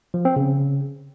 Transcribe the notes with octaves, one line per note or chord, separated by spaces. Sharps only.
F3
C4
C#3